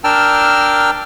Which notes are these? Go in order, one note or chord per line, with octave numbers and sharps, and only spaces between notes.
D4 A#4 G5 A5 E6 F6